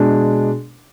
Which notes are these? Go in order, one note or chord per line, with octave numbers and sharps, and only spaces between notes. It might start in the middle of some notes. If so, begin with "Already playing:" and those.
Already playing: B2 G#3 D4